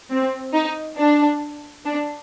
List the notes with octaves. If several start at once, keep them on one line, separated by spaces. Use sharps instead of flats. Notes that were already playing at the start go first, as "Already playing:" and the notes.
C4
D#4
D4
D4